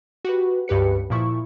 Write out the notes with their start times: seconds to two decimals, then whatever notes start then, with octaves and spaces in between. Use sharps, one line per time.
0.25 F#4 G4 B4
0.68 C#2 G2 G4 B4 C#7
1.10 A#2 F3 E4 C#6